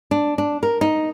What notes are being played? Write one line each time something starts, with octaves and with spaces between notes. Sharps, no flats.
D4
D4
A#4
D#4